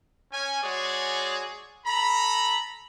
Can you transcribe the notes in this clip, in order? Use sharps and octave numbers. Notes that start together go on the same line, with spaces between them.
C#4 G#5
G#3 F#4 G#4 C#5 D5
A4 A#5 B5